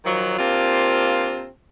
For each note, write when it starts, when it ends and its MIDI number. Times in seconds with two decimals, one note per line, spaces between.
0.05 0.38 51
0.05 0.38 53
0.05 0.38 54
0.39 1.47 48
0.39 1.47 58
0.39 1.47 60
0.39 1.47 62
0.39 1.47 65